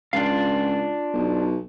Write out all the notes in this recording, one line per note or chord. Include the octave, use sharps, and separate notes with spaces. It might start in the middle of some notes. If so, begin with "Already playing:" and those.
C#2 D4 F4 F5
B1